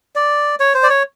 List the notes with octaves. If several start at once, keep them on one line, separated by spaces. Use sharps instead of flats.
D5
C#5
C5
D5
C#5